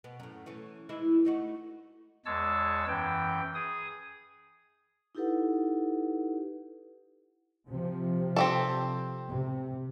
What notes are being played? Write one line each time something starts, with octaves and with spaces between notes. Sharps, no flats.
B2 B3
F#2 A2
E3 A3 C#4
E3 G#3 E4
A3 D#4 F#4
E2 G#3 C#5 A5 E6
F#2 E3 G5
G#4 D#6
D#4 E4 G4 A4 B4 F#5
C3 F3
C4 G4 A4
C3